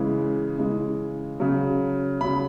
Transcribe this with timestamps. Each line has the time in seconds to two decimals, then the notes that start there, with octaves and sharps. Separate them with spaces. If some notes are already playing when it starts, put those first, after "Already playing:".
Already playing: C#3 E3 G#3
0.58 C#3 E3 G#3
1.40 C#3 F#3
2.21 C#3 F#3 B5